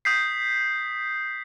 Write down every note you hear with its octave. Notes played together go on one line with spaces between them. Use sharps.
D#6 G6 B6 C7